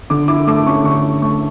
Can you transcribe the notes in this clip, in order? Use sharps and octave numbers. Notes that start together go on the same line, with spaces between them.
D3 D6
E4 D6
A3 D6
C#4 C#6
D3 C#6
E4
A3 C#6